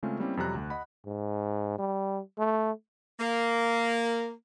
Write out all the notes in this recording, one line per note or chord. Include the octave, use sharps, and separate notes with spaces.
C#3 G#3 A3 C4 C#4 F4
G3 A#3 C4 C#4 E4
F2 C3 F#3 G3 A#5 F#6
D2
D#5 F#5 B5
G#2
G3
A3
A#3